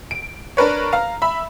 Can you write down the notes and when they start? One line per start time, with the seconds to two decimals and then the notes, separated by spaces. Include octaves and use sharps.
0.11 D7
0.57 D4 A#4 B4 C#5
0.93 F5 A#5
1.22 E5 B5